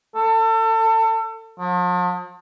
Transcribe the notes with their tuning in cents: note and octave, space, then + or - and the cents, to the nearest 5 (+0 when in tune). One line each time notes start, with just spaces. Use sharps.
A4 +30
F3 +40